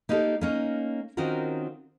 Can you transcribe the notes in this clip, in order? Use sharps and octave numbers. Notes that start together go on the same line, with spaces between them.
A#3 D#4 E4 F#4 G4 A4
A#3 C#4 D#4
D#3 C4 C#4 F4 F#4 A#4